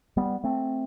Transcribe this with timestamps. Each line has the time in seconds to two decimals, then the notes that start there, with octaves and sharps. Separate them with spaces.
0.17 G3 B3
0.44 A3 C4